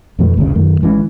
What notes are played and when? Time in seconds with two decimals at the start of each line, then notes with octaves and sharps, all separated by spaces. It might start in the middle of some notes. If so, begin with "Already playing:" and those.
0.19 F2 B2 E3 A3
0.37 G1 D2 C#3
0.55 F#2 D#3 A3
0.82 G#1 E3 G#3 C#4